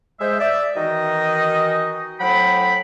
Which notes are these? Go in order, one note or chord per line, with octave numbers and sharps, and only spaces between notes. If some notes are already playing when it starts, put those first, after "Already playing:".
G#3 C5 E5
D5 E5
D#3 E3 D#4 F#4 D#5
A2 F#3 C5 F#5 G5 B5